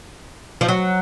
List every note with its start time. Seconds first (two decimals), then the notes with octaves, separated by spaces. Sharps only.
0.61 F3
0.69 F#3